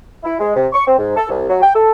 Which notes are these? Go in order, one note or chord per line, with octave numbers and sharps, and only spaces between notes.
E4
G#3
C3
C#6
C4
G#2
A4
C2
F#3
G5
A4